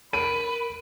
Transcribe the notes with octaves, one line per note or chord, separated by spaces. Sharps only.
A#4 B4 B5 D7 D#7